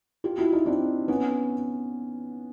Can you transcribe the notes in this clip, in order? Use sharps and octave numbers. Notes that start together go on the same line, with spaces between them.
F4 G4
E4 F#4
D#4 F4
C4 D4
B3 C#4